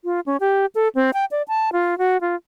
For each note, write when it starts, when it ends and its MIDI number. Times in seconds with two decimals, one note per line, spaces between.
0.04 0.20 65
0.26 0.37 61
0.40 0.66 67
0.75 0.88 69
0.95 1.11 60
1.14 1.25 79
1.31 1.42 74
1.48 1.70 81
1.73 1.98 65
1.98 2.20 66
2.21 2.35 65